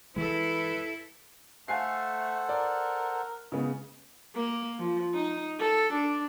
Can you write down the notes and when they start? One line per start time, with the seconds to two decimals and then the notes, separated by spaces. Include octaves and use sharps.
0.16 E3 G#3 E4 A4 B4
1.68 A3 A4 C5 F5 F#5 G#5 C7
2.49 A#4 D5
3.52 C#3 G#3 B3
4.35 A#3
4.79 F3
5.14 D#4
5.59 A4
5.93 D4